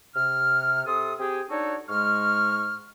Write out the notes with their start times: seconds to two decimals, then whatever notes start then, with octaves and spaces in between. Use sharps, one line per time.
0.15 C3 F6
0.85 C3 A4 C6 D#6
1.19 C4 G4 G#4
1.50 D4 D#4 F#4 A4 C#5
1.88 G#2 G#3 C#6 F6